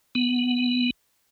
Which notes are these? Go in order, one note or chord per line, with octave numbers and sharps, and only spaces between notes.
B3